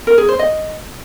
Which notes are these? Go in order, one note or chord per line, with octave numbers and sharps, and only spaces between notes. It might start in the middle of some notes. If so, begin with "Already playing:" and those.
A#4
G#4
C5
D#5